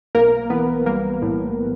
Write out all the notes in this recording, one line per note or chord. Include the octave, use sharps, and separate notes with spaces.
B1 A#3 A#4
E3 B3 B4
G3 A#3 A#4
A2